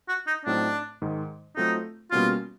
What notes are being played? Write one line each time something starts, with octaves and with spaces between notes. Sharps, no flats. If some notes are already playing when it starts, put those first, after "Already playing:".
F#4
D#4
A2 F#3 A3 C4 D4 D#4
G#2 D#3 G#3
F#3 A3 C4 D#4 F4 A4
B2 G3 A#3 C#4 F4 F#4